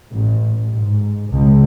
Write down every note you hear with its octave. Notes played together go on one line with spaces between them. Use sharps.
A1
G#2
C#2